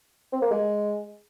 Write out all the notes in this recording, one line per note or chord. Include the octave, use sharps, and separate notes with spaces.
C4
A#3
G#3